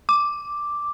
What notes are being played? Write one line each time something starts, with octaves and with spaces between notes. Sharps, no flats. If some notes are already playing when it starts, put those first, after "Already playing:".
D6